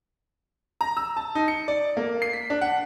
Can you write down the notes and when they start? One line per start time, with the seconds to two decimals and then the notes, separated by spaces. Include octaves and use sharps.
0.81 A#5
0.97 E6
1.17 A5
1.35 D#4
1.48 C#7
1.68 D5
1.97 A#3
2.22 C7
2.33 B6
2.50 D4
2.61 F#5